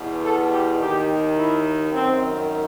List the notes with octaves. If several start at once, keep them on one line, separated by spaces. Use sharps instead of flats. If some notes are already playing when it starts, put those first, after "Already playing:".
Already playing: E2 B2
A4
G4
D#2 D#3 G4
E4
F#2 D#3 C4